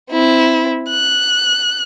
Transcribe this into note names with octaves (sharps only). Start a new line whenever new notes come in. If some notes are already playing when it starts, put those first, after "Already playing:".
C4 E4
F#6